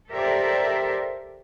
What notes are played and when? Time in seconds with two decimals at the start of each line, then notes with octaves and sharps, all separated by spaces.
0.11 G4 A4 A#4 C5 D5 E5